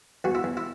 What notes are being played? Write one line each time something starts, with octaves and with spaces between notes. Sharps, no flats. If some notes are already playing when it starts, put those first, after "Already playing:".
E2 F#4
E4
E2
E4